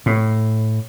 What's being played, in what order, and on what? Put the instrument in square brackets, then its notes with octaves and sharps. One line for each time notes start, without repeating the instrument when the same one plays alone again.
[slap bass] A2